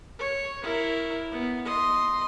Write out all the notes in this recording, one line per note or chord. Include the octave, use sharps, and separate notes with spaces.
C#5
E4 A#4
B3
D#5 C6